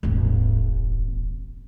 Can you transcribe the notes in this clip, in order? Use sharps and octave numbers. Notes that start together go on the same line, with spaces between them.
D#1 G#1